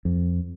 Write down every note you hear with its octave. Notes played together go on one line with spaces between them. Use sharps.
F2